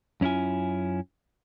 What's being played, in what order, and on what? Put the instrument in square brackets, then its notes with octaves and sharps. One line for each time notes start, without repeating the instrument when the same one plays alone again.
[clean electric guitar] F#2 C#4 E4 F4 G#5